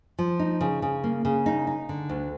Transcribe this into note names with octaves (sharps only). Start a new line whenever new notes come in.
F3
D#4
C#3
C#3
A#3
C#3
D#4
D#4
D3
D2